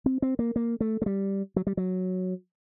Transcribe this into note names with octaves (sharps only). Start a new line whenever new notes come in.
C4
C4
A#3
A#3
A3
A3
G3
F#3
G3
F#3